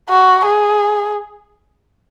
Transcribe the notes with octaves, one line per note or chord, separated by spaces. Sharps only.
F#4
G#4